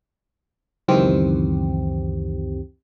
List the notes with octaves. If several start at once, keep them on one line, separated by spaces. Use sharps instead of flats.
C#2 F#2 D#3 E3 C4 G4